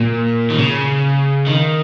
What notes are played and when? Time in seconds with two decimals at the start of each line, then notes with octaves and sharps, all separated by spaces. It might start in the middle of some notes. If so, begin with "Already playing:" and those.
Already playing: A#2
0.50 D#3
0.59 C#3
1.47 D#3